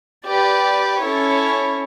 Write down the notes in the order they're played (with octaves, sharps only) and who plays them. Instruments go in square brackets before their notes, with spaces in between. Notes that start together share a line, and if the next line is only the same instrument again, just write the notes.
[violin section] G4 B4 D5
C#4 E4 A4 C#5